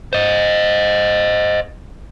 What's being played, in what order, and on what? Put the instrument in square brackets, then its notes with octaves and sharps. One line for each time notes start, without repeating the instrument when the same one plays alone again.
[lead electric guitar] C5 D#5